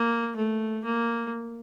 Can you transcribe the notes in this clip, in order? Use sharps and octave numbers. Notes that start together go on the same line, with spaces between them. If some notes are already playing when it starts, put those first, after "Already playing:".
Already playing: A#3
A3
A#3